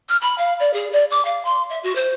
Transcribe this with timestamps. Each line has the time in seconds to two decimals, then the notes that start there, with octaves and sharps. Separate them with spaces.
0.09 F6
0.21 B5
0.38 F5
0.60 D5
0.73 G#4
0.92 D5
1.11 D6
1.25 F5
1.45 C6
1.69 E5
1.83 F#4
1.95 C5